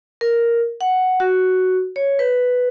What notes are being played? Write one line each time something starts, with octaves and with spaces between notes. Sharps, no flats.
A#4
F#5
F#4
C#5
B4